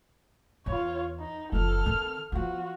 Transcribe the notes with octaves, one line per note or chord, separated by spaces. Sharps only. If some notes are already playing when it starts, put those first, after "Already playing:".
E2 F4 C#5
D#4
F#1 F3 A4 F6
D#3 C4
F3 B3 F4 F#4